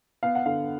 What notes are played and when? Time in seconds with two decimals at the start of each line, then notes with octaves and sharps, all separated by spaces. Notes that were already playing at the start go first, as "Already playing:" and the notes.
0.23 B3 F5
0.35 F#5
0.46 D3 F5